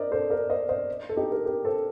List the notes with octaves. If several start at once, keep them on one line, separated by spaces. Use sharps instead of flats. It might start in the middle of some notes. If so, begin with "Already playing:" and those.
Already playing: A#4 C5 D5 D#5
A4 C5
A#4 D5
C5 D#5
C5 D#5
A4
D#4 G4
G4 A#4
G4 A#4
A4 C5